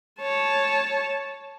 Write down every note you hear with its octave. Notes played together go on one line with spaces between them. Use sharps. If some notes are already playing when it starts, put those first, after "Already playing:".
C#5 A5